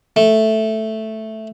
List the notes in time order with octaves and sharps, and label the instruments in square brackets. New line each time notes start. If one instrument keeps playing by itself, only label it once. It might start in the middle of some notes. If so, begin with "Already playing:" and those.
[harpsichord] A3